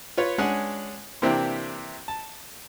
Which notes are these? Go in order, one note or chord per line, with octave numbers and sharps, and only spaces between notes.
F4 B4 C#5
G#3 C#4 D4 F#5 G#5
C3 E3 A#3 C4 D4 G4
A5